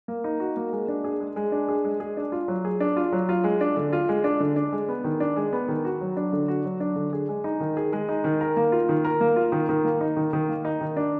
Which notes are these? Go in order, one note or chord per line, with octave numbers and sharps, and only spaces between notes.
A#3
D#4
F#4
A#3
G#3
D4
G#4
G#3
G#3
D4
G#4
G#3
G#4
D4
F4
F#3
G#4
D4
F4
F#3
F4
G#3
D4
D3
F4
G#3
D4
D3
D4
G#3
B3
D#3
D4
G#3
B3
D#3
F#4
F#3
D4
D3
F#4
F#3
D4
D3
G#4
G#3
D#4
D#3
G#4
G#3
D#4
D#3
A#4
A#3
F4
D#3
A#4
A#3
F4
D#3
D#3
A#3
D#4
D#3
D#3
A#3
D#4
D#3
D4